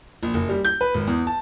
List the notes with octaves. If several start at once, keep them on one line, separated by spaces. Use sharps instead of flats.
A#1
F#1
G3
G6
B4
G#1
E2
A5